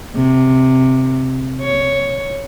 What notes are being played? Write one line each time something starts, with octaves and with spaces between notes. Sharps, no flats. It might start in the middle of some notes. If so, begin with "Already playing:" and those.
C3
C#5